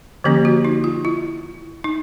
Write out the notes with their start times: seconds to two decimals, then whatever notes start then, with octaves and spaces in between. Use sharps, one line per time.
0.24 D3 F3 A#3 C#4 G4
0.45 F#4
0.65 D#4
0.84 F4
1.05 E4
1.84 D#4